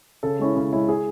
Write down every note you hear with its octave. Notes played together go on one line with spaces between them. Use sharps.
C#3 A4
G#3 C#4 E4
C#3
G#3 C#4 E4
G#4